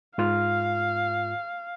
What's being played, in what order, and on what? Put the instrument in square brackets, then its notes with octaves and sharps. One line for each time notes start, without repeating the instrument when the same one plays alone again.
[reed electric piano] G#2 F4 F6 [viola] F5